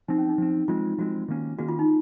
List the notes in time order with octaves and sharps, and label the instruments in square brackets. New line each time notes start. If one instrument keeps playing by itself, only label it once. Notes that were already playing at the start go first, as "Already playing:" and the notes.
[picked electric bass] F3 C4 [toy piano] D#4
[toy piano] C#4
D#4
[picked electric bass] F3 C4
[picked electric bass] F3 G#3 C4 [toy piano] F4
[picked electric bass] F3 G#3 C4 [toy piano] F#4
[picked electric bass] D#3 A#3 C#4
[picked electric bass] D#3 A#3 C#4 [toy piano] F#4
[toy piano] F4
D#4